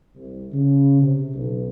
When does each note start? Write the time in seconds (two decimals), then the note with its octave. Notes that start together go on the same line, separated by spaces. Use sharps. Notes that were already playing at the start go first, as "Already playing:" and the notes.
0.16 C2
0.52 C#3
1.01 C3
1.34 B1